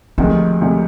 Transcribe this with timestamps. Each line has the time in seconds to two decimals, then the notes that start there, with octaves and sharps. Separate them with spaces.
0.18 D2 C3 D#3 F3 G#3
0.61 D2 C3 D#3 G#3